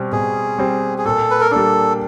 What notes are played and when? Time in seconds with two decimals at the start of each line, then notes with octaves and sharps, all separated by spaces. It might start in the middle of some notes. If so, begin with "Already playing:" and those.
Already playing: B2 G3 C4
0.12 B2 G#4
0.58 G3 C4
0.98 G#4
1.05 A#2 A4
1.30 B4
1.41 A#4
1.51 G3 A#3 D4 A4